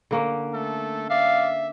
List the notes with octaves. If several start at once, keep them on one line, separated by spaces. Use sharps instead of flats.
D3 A#3 C#4
A3 A4
D5 E5 F5